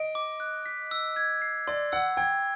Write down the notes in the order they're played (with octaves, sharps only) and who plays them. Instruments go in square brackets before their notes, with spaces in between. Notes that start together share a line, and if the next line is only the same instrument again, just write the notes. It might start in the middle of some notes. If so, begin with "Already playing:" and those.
Already playing: [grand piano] D#5 [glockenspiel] D7
[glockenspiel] D6
F#6
B6
E6
G#6
C7
[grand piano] D5 [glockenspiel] C6
[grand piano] F#5 [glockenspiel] E6
[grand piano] G5 [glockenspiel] G#6